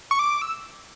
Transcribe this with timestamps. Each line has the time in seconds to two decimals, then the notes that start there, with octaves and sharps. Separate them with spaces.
0.11 C#6
0.19 D6
0.42 E6